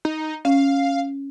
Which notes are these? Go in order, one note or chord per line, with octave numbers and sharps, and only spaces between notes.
D#4
C#4 F5